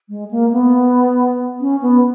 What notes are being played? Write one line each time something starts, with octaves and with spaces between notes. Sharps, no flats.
G#3
A#3
B3
C#4
B3